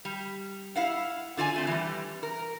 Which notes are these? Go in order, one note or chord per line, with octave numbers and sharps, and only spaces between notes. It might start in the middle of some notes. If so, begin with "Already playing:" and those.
G3
E4 F5 F#5
D3 F4 D5 G#5
A3 C4
E3 G3
A#4